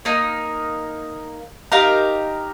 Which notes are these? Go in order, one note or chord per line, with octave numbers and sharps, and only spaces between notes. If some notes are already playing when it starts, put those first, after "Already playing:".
A#3 D#4 A#4
D#4 G4 A#4 F5